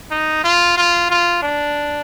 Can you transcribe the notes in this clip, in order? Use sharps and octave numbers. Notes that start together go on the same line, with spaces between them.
D#4
F4
F4
F4
D4